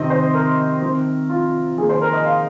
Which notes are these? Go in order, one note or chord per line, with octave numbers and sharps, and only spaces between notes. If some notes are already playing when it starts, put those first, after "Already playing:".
Already playing: C3 D#3 C4 D#5
C5
A#4
D#3 C4
F4
D#3 A#3 G#4
C5
A#4
D#5
F5